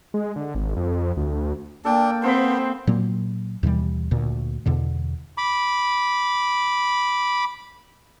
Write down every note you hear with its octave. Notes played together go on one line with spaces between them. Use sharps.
G#3
D3
G#1
F2
D2
A#3 D4 A4 G5
B3 C4 C5 B5
A#2 F#3 A#3
D#2 B2 E3 G3
D2 A#2
E2 B2 D3
B5 D6